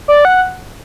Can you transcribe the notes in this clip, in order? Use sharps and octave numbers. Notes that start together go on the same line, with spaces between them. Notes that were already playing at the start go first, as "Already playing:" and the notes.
D5
F#5